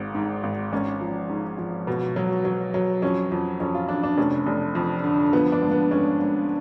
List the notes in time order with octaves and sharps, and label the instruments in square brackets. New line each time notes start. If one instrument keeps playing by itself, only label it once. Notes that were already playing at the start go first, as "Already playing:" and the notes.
Already playing: [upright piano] G#1 G#2
G#2
G#1
G#1 C#4
F3
G#2
F3
B2
F#3
F#3
F#3
F2 C#4
F2
F2 C#4
F4
F2 D4
D4
F1 C#4
F1
F2
D3
F3 B3
D4
G#1
B3
G#1 C#4
G#1